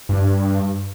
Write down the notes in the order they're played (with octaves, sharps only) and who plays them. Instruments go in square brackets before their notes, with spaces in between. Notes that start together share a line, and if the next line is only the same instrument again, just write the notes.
[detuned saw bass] G2